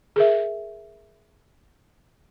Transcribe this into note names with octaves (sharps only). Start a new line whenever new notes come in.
G#4 A#4 E5